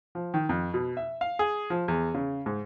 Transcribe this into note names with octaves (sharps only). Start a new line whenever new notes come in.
F3
D#3
F2
B2
E5
F5
G#4
F3
E2
C#3
G#2